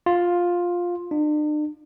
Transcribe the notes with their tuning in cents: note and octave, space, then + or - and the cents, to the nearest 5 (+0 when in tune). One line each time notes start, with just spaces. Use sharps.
F4 +10
D4 +45